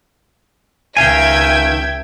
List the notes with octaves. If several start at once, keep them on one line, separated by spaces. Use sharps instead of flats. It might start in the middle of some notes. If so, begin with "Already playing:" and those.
C#2 D#3 E5 F5 G5 G#5 G#6